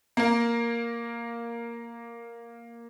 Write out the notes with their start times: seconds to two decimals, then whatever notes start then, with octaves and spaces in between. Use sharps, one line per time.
0.17 A#3 A#4